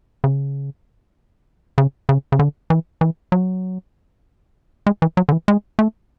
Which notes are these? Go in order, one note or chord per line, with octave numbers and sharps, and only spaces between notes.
C#3
C#3
C#3
C#3
D3
E3
E3
F#3
G#3
E3
F#3
D3
E3
G#3
A3